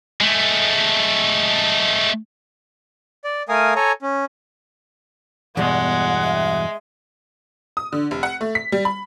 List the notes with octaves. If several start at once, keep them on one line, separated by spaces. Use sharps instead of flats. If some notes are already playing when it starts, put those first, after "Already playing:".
G#3 A3
D5
A3 A#4 F5 G#5 D#6
A4 C#5 G#5 A#5
C#4
E2 G2 B2 G#3 B3 F#5
E5
D#6
D3
F1
F#5
A3
B6
G3
B5